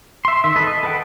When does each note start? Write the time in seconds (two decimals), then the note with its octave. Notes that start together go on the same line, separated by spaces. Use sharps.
0.25 E5 C6
0.44 D#3 E5
0.56 A4 B4 D#5 B5
0.67 D#5
0.83 A4 B4 F#5 G5